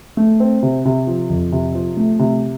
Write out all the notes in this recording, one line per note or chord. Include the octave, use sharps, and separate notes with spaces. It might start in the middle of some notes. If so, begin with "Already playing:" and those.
A3
C4
C3
C3
F3
F2
C3
F3
A3
C3